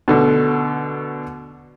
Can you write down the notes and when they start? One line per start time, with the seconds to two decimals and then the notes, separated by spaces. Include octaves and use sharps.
0.08 B2 D3 A3